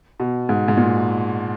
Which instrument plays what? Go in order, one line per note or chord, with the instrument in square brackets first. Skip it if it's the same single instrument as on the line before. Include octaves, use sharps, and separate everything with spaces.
[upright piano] B2
G#2
G#2
A#2